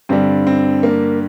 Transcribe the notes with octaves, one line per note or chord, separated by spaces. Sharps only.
G2 D3 G3 C4
C4
A#3